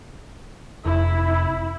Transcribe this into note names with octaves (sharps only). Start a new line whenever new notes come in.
F1 E4